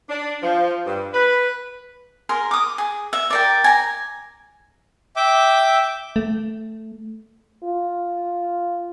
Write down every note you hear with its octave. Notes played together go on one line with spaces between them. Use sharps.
D4
F3
G2
B4
G#4 A#4 C6
D6 D#6
G#4
E5
G4 A#4 D5
G#5 A#5
E5 G5 D6
A3
F4